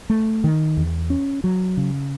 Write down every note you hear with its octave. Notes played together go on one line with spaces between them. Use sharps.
A3
D#3
E2
C#4
F#3
C#3